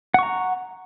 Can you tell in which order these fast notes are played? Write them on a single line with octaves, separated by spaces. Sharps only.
F#5 C#6 A#5